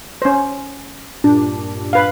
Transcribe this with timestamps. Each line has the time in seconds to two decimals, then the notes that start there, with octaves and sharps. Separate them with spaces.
0.22 C#4 C5
1.24 G2 A#2 D4
1.93 B4 F5